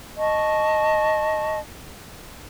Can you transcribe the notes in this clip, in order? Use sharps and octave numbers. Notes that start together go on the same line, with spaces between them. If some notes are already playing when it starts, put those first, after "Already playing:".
D#5 A5 C#6